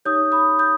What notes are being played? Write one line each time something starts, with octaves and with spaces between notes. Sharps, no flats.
D#4 G4 C#5 D#6 G6
B5 D#6
D#6 G6